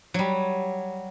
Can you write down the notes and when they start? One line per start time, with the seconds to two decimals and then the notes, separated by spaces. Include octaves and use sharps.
0.14 F#3 G3